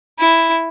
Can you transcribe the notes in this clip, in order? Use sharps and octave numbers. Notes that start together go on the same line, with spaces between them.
E4